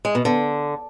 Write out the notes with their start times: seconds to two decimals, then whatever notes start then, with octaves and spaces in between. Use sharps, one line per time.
0.05 G#3
0.15 B2
0.25 D3